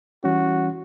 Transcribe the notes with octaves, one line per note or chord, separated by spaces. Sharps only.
E3 G3 C#4 F#4